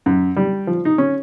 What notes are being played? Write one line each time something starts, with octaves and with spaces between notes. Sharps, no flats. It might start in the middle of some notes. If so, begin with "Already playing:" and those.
F#2
G3
F3
D#4
C#4